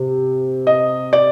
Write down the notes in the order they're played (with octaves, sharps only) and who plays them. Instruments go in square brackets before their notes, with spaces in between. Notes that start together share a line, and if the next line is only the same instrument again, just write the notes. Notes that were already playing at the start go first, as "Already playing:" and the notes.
Already playing: [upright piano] C3
[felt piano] D#5
D5